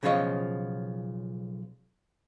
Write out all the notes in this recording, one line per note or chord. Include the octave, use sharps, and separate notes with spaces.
B1 C#3 F3 F4 C#5 D#5